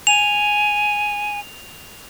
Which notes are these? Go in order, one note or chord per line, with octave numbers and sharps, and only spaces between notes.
G#5 F7